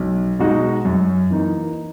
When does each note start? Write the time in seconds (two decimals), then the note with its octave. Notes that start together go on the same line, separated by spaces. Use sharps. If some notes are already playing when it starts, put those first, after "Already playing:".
Already playing: B1
0.39 B2 G#3 D#4 F#4
0.85 F#2
1.30 E3 A#3 D#4